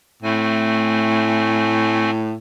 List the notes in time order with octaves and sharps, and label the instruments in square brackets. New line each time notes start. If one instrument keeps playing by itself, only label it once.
[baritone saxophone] A2 [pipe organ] A3 C4 G#5